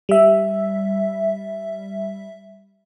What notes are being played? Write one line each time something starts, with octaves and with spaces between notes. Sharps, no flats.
G3 E5